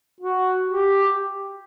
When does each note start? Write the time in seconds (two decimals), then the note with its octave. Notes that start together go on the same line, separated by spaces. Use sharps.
0.20 F#4
0.69 G4